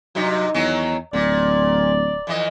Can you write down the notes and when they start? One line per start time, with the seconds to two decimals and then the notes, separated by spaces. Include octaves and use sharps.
0.15 G2 C3 F#3 D#4
0.54 E2 D#3 F#3 C#4
1.13 D1 A#2 D5
2.27 F2 E3 D#5